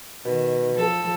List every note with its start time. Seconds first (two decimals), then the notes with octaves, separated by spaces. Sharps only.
0.25 B2 D#3
0.73 F3 A4